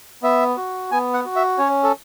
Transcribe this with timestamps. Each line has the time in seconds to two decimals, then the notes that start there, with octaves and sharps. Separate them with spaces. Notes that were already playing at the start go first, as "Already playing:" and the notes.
0.23 B3 E5
0.57 F#4
0.91 B3 G#5
1.14 F#5
1.25 F#4
1.36 E5
1.58 C#4 C#5
1.83 A4